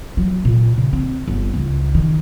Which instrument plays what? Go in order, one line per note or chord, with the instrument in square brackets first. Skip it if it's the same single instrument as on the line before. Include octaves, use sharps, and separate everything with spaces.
[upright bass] F#3
A#2
C#3
C4
G1
C#2
D#3